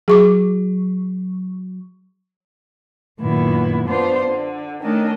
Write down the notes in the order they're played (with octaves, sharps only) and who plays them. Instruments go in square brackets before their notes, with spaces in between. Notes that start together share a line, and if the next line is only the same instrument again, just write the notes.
[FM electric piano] F#3 [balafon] G#4 C#6 D6
[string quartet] F#2 A#2 D#3 B3 E4
B3 D4 F4 C5
D3
D#3 A3 C#4 D4 D#5